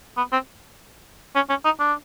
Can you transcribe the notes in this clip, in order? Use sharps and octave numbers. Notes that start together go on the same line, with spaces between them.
B3
C4
C#4
C#4
D#4
D4